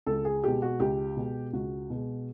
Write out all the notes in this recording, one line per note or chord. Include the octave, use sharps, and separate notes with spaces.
C#2 A4
G#4
B2 G#3 G4
F#4
C#2 G4
B2 G#3
C#2 F#4
B2 G#3